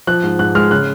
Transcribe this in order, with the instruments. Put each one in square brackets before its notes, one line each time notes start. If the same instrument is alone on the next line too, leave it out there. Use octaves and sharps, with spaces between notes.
[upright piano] F3 F#6
G#2
G#2 F#6
G#3 F6
C#3 F#6